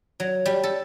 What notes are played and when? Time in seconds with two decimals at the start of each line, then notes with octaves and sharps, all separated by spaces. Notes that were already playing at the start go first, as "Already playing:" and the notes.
0.20 F#3
0.46 G3
0.63 A4